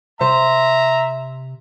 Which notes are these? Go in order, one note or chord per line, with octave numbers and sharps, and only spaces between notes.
C3 C5 E5 A#5